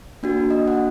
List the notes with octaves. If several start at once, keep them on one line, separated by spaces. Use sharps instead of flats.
A#3 D4 F#4
D#5
F#5